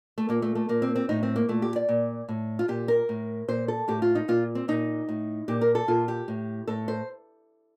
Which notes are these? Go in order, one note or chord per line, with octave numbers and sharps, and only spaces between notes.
A3
A#2 A#3
A3
A3
A#2 A#3
C4
C4
A2 D#4
C4
A#3
A#2 A3
G4
D5
A#2
A2
F4
A#2 G4
A#4
A2
A#2 C5
A4
A2 G4
F4
D#4
A#2 F4
C4
A#2 D#4
A2
A#2 G4
A#4
A4
A#2 F4
G4
A2
A2 A4
C5